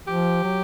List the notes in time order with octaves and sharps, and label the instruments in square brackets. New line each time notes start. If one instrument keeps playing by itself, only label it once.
[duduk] F3 [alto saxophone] G4
[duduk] F#3